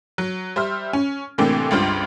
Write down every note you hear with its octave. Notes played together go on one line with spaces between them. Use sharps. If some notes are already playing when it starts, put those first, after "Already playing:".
F#3
G3 C5 E5 F6
C#4
A2 C3 E3 A#3 C4 D4
G1 C#2 G2 F4 C5 F6